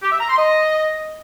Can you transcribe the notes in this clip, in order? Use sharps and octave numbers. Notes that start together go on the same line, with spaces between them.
G4
E5
A#5
C6
D#5